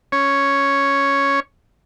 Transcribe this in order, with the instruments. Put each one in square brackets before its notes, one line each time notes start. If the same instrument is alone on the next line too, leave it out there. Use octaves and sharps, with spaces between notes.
[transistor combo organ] C#4 C#5